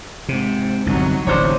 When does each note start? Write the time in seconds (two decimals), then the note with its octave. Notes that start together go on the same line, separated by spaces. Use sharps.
0.29 G#2 C3
0.87 G1 C2 F#3 D#4
1.27 D1 A1 D2 C3 D4 D#4 C5 C#5